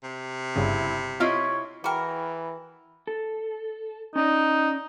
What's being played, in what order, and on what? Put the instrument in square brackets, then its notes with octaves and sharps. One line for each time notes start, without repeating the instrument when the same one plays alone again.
[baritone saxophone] C3
[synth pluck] G1 G2 C#3 [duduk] E4
[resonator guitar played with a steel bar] C4 E4 D#5 [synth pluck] F4 F6 [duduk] C#5
[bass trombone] E3 [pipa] F#4 A#4 [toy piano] G#4 G5 [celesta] B5
[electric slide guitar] A4
[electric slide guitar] C#4 D5 D#5 [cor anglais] D#4